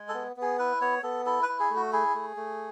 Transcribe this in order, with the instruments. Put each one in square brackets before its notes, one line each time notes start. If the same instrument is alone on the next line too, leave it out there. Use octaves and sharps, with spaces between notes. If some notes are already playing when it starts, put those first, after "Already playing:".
Already playing: [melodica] G#3
A4
B3
B3
G#4
E4 B4
B3 C#5
B3 A4
E4 A4
B4
E4
G#4
A3
F#4
E4 G#4
A3
A3